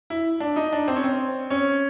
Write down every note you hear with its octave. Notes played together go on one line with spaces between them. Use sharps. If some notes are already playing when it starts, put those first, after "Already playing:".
E4
D4
D#4
D4
C4
C#4
C4
C#4